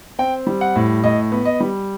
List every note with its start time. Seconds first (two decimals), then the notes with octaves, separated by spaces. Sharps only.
0.19 C4 G5
0.47 G3
0.61 F#5
0.76 A2
1.04 A2 D#5
1.32 B3
1.45 D#5
1.60 G3